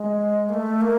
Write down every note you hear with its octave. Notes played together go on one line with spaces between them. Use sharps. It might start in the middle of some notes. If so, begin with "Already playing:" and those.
Already playing: G#3
A#3
A3
A#3